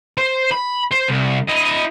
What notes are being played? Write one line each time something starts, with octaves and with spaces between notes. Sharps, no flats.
C5
B5
C5
C2
E4 D#5